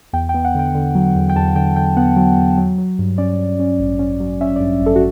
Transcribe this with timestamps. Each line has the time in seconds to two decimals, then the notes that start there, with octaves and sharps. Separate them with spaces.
0.13 E2 G5
0.29 G5
0.34 B3
0.45 F#5
0.55 D3 G5
0.75 D3
0.95 F#3
1.15 E2
1.29 G5
1.35 E2 A5
1.55 D3 G5
1.76 D3 G5
1.97 B3 F#5
2.17 F#3
2.37 E2
2.58 F#3
2.78 F#3
2.99 G2
3.18 C#4 D5
3.39 G2
3.59 C#4
3.79 A1
3.99 C#4
4.20 F#3
4.41 C#4 E5
4.56 D5
4.60 G2
4.81 A1
4.86 A4
4.96 F#4